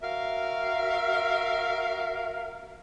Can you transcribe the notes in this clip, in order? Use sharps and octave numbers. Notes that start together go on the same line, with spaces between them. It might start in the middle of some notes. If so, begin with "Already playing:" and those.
F#4 A#4 E5 F5